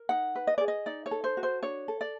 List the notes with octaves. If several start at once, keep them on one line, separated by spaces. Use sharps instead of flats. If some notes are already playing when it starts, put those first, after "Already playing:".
Already playing: A#4
D#4 F#5
B4
D#5
G#4 D5
D#5
D#4 D5
C#5
A4
C5
F#4
C5
D4 C#5
A4
D5